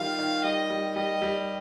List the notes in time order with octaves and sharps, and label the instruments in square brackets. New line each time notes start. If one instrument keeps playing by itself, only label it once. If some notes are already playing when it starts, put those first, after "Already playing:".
Already playing: [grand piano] D#3 G3 F4 [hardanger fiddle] F5
[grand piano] D#3
[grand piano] G3 [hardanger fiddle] D#5
[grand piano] G3
[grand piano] G3 [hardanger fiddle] D#5
[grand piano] G3